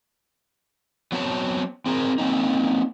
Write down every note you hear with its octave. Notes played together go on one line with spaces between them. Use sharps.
F#3 B3 C4 C#5 A5
C4 G#4 A#4
A#3 C4 C#4 D#4